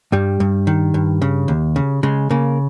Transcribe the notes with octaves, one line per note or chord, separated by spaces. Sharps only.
G2 G3
G2
D#3
G2
C#3
D#2
C#3
C#3 G#3
C#3 A#3